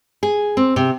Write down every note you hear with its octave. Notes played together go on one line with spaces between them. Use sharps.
G#4
C4
C3